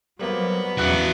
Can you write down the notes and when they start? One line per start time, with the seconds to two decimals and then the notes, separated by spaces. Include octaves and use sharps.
0.19 F#3 G3 A#3 B3 C5
0.78 A1 E2 E4 F#4 F#6